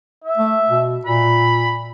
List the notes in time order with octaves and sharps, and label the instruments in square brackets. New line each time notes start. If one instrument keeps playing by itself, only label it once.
[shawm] E5
[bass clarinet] A3
B2
[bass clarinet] A#2 [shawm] B5